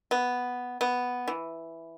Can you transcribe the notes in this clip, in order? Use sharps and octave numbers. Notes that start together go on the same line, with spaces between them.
B3
B3
E3